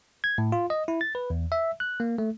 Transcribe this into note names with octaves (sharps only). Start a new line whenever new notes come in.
G#6
A2
F4
D#5
E4
A6
B4
E2
E5
F#6
A#3
A3